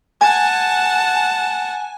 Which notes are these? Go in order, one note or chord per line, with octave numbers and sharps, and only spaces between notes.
F#5 G#5 A5